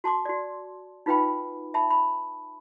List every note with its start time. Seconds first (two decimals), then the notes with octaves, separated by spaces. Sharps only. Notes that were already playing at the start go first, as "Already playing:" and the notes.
0.04 F#4 A5 C6 D6
0.25 F#4 D5
1.06 D#4 F4 B4 F5 G5 B5
1.74 E5 A5 B5
1.90 B5